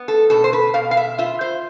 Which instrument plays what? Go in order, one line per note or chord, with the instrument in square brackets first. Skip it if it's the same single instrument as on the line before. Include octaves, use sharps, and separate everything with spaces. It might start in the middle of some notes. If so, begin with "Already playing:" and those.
Already playing: [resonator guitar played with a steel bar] B3
A4
B2 A4
C5
B4
B2 F5
F5
E5
F4 E5
C5